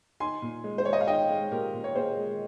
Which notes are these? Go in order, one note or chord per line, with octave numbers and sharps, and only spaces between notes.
D#4 G#5 C6
A#2
G#3
C5
G#3 C#5
D#5
F5
D#4 D#5 G5
G#3
A#2 G4 A#4
A#2
C#5
A#2 G#4 C5
G#3